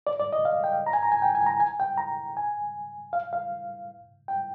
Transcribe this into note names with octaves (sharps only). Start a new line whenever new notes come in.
D5
D5
D#5
F5
G5
A#5
G#5
A#5
G#5
G5
G#5
A#5
G#5
G5
A#5
G#5
F5
F5
G5